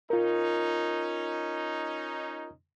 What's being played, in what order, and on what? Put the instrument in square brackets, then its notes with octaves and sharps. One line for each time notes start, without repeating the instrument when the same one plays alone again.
[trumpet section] C#4 D#4 [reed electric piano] F4 A#4